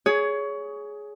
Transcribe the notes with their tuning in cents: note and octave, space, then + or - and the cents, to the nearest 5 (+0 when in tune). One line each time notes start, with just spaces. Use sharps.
G#4 +10 C#5 +20